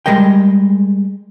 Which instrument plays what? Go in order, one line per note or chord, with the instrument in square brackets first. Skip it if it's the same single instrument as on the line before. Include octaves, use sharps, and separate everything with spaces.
[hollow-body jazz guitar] G3 G#3 A#4 D#5 G5